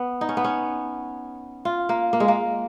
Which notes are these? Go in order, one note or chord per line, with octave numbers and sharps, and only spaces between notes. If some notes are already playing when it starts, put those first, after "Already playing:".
Already playing: B3
D#4
C#4
B3
C#4
F4
A#3
A#3
G#3
A#3